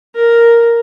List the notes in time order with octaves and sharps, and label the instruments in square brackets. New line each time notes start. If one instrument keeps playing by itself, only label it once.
[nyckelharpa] A#4